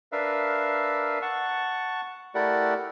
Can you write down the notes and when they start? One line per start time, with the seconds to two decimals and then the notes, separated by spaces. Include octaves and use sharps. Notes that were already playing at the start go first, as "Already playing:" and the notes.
0.12 D4 A#4 B4 E5 F5
1.22 F#5 A5 C#6
2.35 A3 E4 G4 A#4 D5 F#5